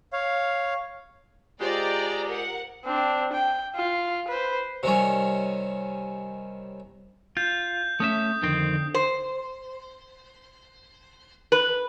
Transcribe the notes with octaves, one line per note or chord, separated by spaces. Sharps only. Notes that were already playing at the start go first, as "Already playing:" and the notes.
C#5 F5
G#3 F4 G4 C5 D5 A#5
A#4 F#5
C4 D4
G5
F4
B4 C5
C3 D#3 G3 C#4
F4 G6
A3 C#4 E5 D#6
F2 D3 D#3 C4
C5
B4